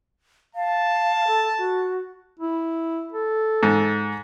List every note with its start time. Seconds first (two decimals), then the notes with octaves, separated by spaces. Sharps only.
0.55 F5 A5
1.28 A4
1.58 F#4
2.39 E4
3.12 A4
3.63 G#2